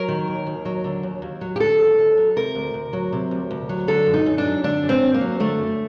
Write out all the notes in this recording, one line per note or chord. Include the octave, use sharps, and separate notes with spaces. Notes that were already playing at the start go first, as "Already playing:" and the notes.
Already playing: F#3 A#4
D#3
D#2
D#2
F#3
D3
D#2
D#2
F#3
G4
D3 A4
D#2
D#2
F#3
C3 A#4
D2
D2
F#3
C3
D2
D2
F#3
D3 A4
F#2
D#4
F#2
D4
F#3
D3 D4
F#2
C4
F#2
A#3
F#3
D3 A3
F#2